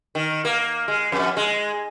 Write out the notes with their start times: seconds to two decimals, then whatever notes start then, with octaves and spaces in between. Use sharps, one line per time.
0.15 D#3
0.45 A#3
0.88 G#3
1.12 F2
1.37 G#3